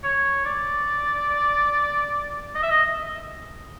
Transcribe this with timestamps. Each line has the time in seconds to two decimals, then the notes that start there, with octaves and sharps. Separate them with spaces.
0.04 C#5
0.45 D5
2.55 D#5
2.63 E5
2.71 D#5